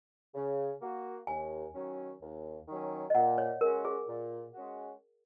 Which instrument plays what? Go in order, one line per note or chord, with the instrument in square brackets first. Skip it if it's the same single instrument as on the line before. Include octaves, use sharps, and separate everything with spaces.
[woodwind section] C#3
A#3 F#4
[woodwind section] D#2 [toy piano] G#5
[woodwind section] D#3 F#3 C#4
D#2
D#3 F#3 C#4
[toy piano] D#5
[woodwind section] A#2 [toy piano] F#5
[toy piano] C#5
[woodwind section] G#3 C#4 F#4 [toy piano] A#4
[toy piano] G#4
[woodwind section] A#2
G#3 C#4 F#4